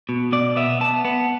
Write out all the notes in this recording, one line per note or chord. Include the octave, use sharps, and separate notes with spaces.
B2
B2 D5
B3 E5
B3 A5
B3